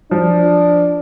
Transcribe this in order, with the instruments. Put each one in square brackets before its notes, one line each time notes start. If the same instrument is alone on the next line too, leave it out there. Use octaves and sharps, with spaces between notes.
[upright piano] F3 [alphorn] D4